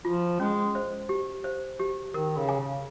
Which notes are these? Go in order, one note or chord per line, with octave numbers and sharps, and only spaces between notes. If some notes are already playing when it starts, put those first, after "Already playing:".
F3 F4
G#3 C#4
C5
G4
C5
G4
D#3 A#4
C#3
G#5
C#3